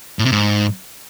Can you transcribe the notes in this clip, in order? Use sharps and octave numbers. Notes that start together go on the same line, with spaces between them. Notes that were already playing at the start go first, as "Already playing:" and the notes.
A2
C3
G#2